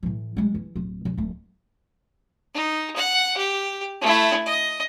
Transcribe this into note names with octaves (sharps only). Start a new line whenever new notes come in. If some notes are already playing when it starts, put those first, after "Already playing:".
A2 E3
G3 G#3
E3
D1
F#2
D1 A3
D#4
F#5
G4
A3 E4
D#5